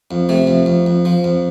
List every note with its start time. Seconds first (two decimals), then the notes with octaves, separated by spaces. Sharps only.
0.11 F2
0.29 C3 A3
0.47 F2
0.66 F2
0.86 F2
1.05 F3
1.24 F2